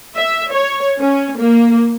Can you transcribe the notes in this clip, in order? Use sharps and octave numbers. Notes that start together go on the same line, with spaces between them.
E5
C#5
C#4
A#3